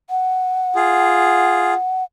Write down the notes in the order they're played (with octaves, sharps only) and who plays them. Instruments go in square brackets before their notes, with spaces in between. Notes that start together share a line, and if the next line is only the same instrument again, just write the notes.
[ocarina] F#5
[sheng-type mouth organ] F4 G#4